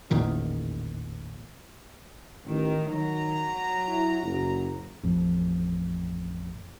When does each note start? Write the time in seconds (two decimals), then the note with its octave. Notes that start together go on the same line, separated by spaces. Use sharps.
0.11 A1 E2 A#2 D#3
2.46 A1 D#3
2.92 D#3 F#3 A#5
3.89 E4
4.22 F#1
5.03 A1 F2